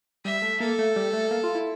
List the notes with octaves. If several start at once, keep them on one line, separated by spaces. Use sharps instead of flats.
G3 E5
A3
A#3 A4
A3
G3
A3
A#3
F4
E4